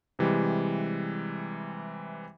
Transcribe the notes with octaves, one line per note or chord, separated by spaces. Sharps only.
C3 E3 G3 G#3